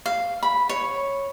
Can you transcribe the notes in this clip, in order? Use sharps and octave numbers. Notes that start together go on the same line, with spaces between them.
F5
B5
C#5